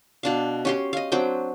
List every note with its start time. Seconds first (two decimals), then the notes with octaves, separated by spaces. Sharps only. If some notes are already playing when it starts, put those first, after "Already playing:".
0.23 B2 D4 F5
0.65 C#4 G4 C6
0.93 D#5 F5
1.12 F#3 C4 D4 G5